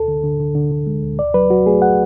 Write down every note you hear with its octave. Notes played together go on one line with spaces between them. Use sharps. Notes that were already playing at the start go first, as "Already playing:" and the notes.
Already playing: D2 A4
D3
D3
D3
D3
D3
G#3
D2
D2 D5
F#3 B4
F#3 F#4
A3 G#4
F#5